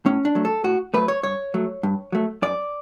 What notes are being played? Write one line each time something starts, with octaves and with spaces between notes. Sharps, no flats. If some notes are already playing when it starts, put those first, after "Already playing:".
A2 C#4
D4
F#3 A3
A4
A2 F#4
F#3 A3 B4
C#5
G2 C#5
F#3 A3
G2
F#3 A3
F#2 D5